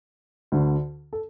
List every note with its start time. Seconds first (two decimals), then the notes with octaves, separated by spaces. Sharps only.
0.52 D2 D3
1.13 A4